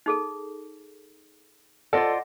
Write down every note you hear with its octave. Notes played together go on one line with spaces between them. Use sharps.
D#4 G#4 A4
F4 A4 C5 D5 D#5 F#5 A#6